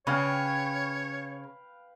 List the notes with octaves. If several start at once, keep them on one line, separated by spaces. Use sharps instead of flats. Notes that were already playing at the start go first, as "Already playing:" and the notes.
C#3 B4 C#5 F5 G5